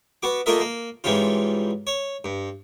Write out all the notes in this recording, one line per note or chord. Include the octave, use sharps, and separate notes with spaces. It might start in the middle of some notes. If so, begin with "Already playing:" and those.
B3 F#4 D6
A3 A#3 F4 A#4 D#5 E5
A#3
G#2 E3 G3 C#4 F4
C#5
G2